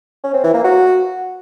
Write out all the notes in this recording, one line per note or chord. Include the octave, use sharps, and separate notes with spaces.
C#4
C4
E3
A#3
F#4